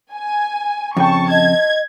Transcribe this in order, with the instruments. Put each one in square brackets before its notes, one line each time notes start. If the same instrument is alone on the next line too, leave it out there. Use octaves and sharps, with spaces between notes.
[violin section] G#5
[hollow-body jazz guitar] F2 C#3 G5 [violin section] A5 C#6
[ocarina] D#5 [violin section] G#6